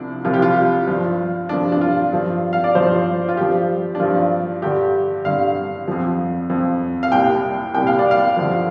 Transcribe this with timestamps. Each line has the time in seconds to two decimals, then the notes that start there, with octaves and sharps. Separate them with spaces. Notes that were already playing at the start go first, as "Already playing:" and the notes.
Already playing: C2 C3 F3 D4
0.25 C2 C3 F3 F4
0.34 G4
0.42 F4
0.87 G2 F3
1.49 G2 F3 D4
1.72 D4
1.81 F4
2.12 G2 F3
2.53 F5
2.64 D5
2.75 G2 F3 C5
3.29 F4
3.37 G2 F3 G4
3.95 D4
4.00 G2 F3 F4
4.62 G2 D3 G3 G4
5.25 G2 D3 G3 F5
5.88 F2 F3
6.50 F2 F3
7.03 F5
7.12 C2 A#2 G3 G5
7.74 C2 A#2 G3 G5
7.87 F5
7.99 D5
8.11 F5
8.37 G2 D3 F3